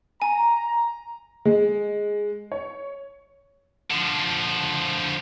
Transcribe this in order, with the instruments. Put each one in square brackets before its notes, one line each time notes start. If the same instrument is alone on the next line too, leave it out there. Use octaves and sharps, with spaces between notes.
[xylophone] G#5 [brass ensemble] A#5
[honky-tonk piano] G#3
C#5
[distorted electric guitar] D3 F3